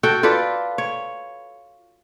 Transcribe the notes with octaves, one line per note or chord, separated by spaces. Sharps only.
F#4 A4 G5
F4 A4 B4 D5
C#5